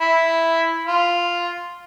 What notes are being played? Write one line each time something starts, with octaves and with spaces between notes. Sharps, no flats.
E4
F4